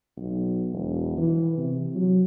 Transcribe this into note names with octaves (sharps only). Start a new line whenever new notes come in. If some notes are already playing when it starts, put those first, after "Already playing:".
B1
E1
E3
C3
F#3